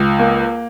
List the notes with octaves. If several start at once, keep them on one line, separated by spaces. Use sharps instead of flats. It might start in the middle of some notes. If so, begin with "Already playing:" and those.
Already playing: C#2
A#3